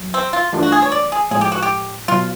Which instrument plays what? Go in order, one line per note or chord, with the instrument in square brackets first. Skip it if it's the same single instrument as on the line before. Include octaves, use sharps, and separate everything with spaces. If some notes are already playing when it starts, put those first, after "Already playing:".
Already playing: [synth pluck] E2 F#3
[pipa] C4
F4
[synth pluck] G2 E3 A3 D4 F4
[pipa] F#4
G#4
C#5
D5
G#4
[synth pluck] A2 F3 G#3 [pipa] G#4
[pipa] G4
F#4
G4
[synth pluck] B2 F#3 [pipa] F4